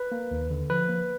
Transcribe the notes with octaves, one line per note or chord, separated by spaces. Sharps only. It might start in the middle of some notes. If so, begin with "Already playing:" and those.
Already playing: B4
A#3
D#2
D3
F3 B4
A#3